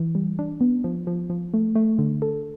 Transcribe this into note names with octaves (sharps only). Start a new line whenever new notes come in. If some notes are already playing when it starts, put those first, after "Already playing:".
Already playing: E3
G3
D4
B3
F3
F3
F3
A3
A3
D3
A4